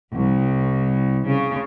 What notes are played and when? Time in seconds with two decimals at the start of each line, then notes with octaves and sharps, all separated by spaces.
0.15 C2
1.28 C#3